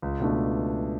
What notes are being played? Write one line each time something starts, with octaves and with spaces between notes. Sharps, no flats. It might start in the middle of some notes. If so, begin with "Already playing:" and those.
C#2
B2 A3 D4